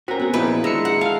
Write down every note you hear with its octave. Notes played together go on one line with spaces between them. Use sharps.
C4 C#4 F#4 A#4
B3 G#4
A#2 F3 D#4 E4 B4
G#3 D4 A#5 E6 C#7
F#5
A4 F5 F6